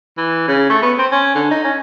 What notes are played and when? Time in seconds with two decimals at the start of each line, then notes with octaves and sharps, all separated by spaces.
0.17 E3
0.48 C#3
0.70 A3
0.82 B3
0.98 C4
1.12 C#4
1.35 D3
1.51 D#4
1.64 C#4